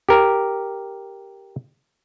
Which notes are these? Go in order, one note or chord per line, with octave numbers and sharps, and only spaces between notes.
G4 A#4